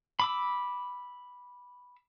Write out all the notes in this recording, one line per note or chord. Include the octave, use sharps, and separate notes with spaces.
B5 D6 E6